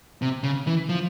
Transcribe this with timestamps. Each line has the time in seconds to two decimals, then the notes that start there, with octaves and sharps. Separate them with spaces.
0.22 C3
0.43 C#3
0.67 E3
0.89 F3